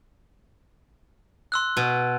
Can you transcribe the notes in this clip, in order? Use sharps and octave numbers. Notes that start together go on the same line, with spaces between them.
C6 E6 F#6
B2